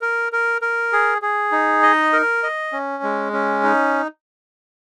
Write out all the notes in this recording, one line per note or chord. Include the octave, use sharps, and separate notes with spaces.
A#4
A#4
A#4
G#4
G#4
D#4
D#5
A#4
D#5
C#4
G#3
C#4
D#4